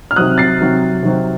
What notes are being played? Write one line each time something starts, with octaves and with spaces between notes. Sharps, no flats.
F6
C3 D#3 F#3 C4 D#6 F#6
A6 C7
C3 D#3 F#3 C4
C3 D#3 F#3 C4